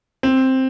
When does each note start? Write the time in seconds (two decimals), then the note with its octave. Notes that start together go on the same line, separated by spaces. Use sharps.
0.23 C4